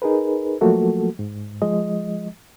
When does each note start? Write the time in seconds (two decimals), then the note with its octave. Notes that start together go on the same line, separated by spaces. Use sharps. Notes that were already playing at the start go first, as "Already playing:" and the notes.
0.02 D#4 G#4 A#4 B4
0.61 F3 F#3 A3 A#3 F#4 A4
1.19 G#2
1.62 F3 G#3 D#5